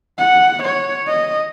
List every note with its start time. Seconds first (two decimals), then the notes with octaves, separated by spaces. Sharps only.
0.19 F#5
0.63 C#5
1.07 D#5